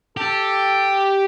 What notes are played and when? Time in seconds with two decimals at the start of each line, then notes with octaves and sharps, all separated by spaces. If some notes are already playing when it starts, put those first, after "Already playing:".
0.17 G4 A4